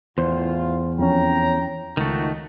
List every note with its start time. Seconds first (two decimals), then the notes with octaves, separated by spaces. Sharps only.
0.18 E2 A2 F4 C5
0.99 F2 C#4 C#5 G5 A#5
1.97 C#2 D#3 F3 A3 D#4 F#4